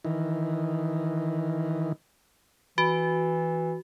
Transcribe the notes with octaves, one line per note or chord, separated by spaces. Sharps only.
D#3 E3
E3 F#4